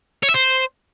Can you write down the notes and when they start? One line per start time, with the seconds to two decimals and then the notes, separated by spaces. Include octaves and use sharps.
0.23 C#5
0.29 E5
0.34 C5